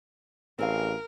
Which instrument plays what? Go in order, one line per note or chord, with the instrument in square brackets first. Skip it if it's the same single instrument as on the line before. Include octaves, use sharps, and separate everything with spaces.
[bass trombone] A1 [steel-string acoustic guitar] C4 G#4 F5 [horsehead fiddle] A#4